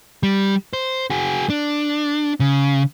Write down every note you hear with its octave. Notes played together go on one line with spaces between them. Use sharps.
G3
C5
F#4 G#4
D4
C#3